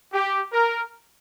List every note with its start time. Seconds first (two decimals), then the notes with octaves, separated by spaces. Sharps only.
0.13 G4
0.52 A#4